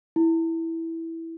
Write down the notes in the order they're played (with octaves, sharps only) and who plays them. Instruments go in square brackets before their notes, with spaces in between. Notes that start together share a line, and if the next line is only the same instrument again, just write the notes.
[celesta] E4